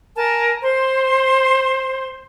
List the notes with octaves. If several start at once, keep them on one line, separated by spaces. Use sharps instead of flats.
A#4 G#5 A5
C5 C6